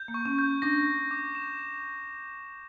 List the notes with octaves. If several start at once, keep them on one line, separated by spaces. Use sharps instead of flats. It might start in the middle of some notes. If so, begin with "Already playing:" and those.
Already playing: G6
A#3
C#6
C#4
G6
D4 A#6
A#6
D6
E7